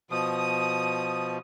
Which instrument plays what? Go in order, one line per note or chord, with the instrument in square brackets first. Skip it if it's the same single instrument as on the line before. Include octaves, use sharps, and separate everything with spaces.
[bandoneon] B2 F3 [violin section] D#6